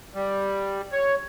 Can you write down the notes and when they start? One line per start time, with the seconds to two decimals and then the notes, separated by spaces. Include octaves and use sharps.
0.14 G3
0.92 C#5